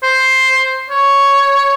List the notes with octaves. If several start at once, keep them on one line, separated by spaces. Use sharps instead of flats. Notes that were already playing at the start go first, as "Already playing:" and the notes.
C5
C#5